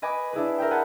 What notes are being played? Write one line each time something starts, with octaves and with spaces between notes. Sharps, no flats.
B4 D#5 G#5 B5 D6
D4 E4 G#4 B4
A#4 E5 G5
G#4 B4 F#5 A5